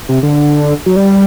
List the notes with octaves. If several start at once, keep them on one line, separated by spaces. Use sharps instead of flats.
C3
D3
F#3
G3